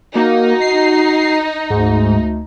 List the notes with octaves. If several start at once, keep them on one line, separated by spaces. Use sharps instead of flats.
A#3 D#4 F#4
C7
D2 G#2